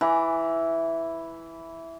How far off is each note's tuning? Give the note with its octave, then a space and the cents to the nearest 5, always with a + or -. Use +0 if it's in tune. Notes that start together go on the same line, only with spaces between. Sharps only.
E3 +0 A#5 +40 D6 +0